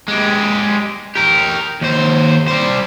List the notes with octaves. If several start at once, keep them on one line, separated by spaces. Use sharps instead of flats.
G#3 G4
G4 A#4
D#2 C5
G3 C5